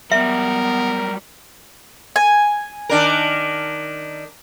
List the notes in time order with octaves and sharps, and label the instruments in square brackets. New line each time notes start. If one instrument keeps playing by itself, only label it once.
[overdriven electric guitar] F#3 G3 [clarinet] B3 [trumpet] A#4 [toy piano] E5
[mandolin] G#5
[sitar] D#3 D4 A#4